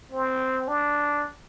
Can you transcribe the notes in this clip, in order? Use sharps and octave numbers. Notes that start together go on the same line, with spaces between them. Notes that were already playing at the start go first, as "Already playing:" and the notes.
C4
D4